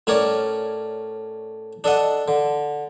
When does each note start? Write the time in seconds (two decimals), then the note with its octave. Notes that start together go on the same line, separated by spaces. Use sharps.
0.07 A2 C#4 A#4 C#5 D5 D6
1.84 D4 A4 D#5 F#5
2.28 D3